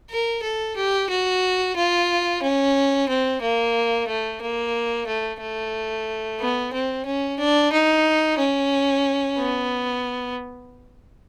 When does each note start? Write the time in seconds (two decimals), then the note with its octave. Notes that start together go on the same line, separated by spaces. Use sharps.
0.10 A#4
0.43 A4
0.76 G4
1.10 F#4
1.76 F4
2.42 C#4
3.09 C4
3.41 A#3
4.08 A3
4.41 A#3
5.07 A3
5.41 A3
6.40 B3
6.73 C4
7.06 C#4
7.39 D4
7.72 D#4
8.39 C#4
9.38 B3